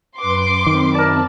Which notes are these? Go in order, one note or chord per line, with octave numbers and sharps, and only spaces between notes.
F#2 B4 C6 D6
F#2 D#3 C4 B5
A#4 D5 A5